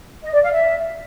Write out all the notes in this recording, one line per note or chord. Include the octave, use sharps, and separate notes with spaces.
D#5
D5
F5
E5